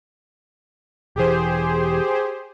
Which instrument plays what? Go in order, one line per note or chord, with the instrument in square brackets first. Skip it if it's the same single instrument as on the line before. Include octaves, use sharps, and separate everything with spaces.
[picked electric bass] E1 E3 [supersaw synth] G4 G#4 C5